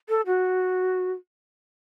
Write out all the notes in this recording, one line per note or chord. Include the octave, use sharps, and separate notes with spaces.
A4
F#4